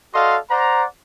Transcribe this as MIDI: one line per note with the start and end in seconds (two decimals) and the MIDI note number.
0.14 0.38 66
0.14 0.38 69
0.14 0.38 74
0.14 0.38 75
0.14 0.38 77
0.14 0.38 84
0.50 0.84 72
0.50 0.84 74
0.50 0.84 78
0.50 0.84 82